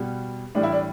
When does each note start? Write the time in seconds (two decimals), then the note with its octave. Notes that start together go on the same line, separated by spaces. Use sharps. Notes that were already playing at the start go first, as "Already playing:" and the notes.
Already playing: B2 G3
0.55 A2 E3 G3 D4
0.63 E4
0.72 D4